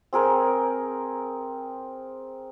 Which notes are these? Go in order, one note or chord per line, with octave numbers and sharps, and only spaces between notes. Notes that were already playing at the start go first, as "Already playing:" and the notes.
C4 G#4 A#4 G5